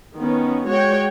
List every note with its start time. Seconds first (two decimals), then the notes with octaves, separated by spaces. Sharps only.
0.17 D#3 B3 C#4
0.67 G#3 F#4 C#5 G5